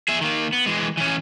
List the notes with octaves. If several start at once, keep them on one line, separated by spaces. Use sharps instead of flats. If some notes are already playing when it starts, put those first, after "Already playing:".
G#4 E5
D#3 A#3
B3
E3 G#3
E3 C#4